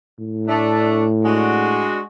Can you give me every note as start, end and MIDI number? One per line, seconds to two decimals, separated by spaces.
0.19 1.92 45
0.48 1.04 57
0.48 1.04 62
1.24 2.00 56
1.24 2.00 62
1.24 2.00 66